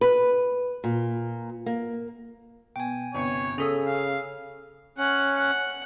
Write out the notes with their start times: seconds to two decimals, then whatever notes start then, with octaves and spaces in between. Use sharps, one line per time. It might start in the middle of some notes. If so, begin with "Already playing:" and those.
0.01 B4
0.84 A#2
1.66 A#3
2.76 B2 G5 G#5
3.15 G1 C3 C#5
3.58 C#3 C#4 A4 D#6 E6 F7
3.87 F5
4.98 C#4 F#5
5.35 F#5